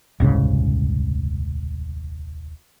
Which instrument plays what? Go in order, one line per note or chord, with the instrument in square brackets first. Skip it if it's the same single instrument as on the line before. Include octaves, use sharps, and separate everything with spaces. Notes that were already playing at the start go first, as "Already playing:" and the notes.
[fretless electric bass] D#1 C2 G#2 C#3